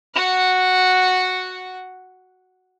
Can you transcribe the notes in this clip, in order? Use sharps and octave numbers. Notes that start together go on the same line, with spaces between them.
F#4 F#5